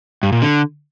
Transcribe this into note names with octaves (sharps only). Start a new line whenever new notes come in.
G2
A#2
D3